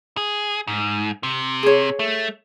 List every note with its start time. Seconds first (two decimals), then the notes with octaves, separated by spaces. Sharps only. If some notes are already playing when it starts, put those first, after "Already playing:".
0.17 G#4
0.67 G#2
1.23 C3
1.63 G#4 C#5
1.99 A3